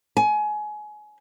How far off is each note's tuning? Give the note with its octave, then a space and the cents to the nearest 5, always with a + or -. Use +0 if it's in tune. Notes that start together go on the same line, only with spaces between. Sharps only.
G#5 +25